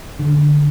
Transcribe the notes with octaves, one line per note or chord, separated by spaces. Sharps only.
D3